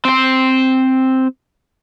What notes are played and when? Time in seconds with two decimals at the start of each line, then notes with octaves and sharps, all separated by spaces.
0.05 C4 C5